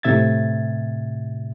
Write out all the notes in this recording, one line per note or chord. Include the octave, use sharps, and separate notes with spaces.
A2 C3 E5 G#6 A6